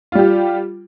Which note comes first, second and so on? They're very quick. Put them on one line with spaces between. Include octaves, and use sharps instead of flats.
F4 G3 G4